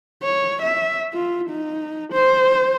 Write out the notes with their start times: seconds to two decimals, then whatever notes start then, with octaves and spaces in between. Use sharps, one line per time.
0.23 C#5
0.62 E5
1.14 F4
1.50 D#4
2.13 C5